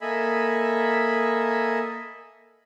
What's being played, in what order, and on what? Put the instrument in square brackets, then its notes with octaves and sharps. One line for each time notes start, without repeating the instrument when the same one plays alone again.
[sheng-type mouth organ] A#3 A4 D#5 E5 G#5 B5